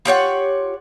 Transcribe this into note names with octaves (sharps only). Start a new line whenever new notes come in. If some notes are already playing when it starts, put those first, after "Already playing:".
F4 G4 C#5 F#5